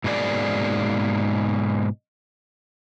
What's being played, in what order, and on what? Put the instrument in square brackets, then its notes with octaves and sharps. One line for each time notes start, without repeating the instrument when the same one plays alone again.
[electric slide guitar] G#2 B2 A#3 G#4 D5